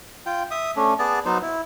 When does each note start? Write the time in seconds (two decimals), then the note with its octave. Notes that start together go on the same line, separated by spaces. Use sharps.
0.26 F4 G5
0.51 E5 D#6
0.76 A3 C#4 D4
0.99 B3 G#4 D5 A5
1.25 F#3 B3 D#4 C5
1.42 E4